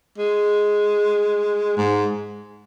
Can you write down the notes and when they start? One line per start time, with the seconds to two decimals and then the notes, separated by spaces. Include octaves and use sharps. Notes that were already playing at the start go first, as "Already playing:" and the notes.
0.18 G#3
1.77 G#2